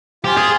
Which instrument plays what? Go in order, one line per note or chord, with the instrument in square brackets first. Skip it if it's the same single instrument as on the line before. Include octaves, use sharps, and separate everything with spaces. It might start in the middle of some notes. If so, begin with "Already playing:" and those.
[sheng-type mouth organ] F4 C5 F5 G#5 [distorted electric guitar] G4
[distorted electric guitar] G#4